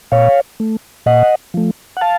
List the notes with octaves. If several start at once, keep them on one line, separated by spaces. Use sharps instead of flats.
A#2 C#5 F5
A3
A#2 D#5 F#5
F3 A3
F#5
F5 A5